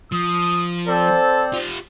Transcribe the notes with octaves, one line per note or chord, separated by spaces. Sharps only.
F3 D#6
C4 A4 C5 D5
F4 G4